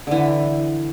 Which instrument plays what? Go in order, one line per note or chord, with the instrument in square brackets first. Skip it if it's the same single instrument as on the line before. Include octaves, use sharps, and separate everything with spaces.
[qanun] D3 E3